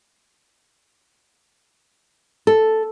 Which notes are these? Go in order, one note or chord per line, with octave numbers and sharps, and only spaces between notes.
A4